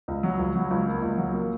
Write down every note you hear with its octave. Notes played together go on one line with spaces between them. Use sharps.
C#2
F#3
C#2
F#3
C#2
A#3
C#2
F#3
A#3